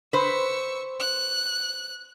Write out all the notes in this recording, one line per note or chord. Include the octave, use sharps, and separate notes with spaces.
B4 C5 C#6 E6
F#6